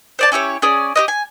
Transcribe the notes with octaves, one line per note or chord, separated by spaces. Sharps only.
C5 D5 A5
C#4 E4 G4 C#5
C#4 G#4 D5
G4 B4 D#5
G#5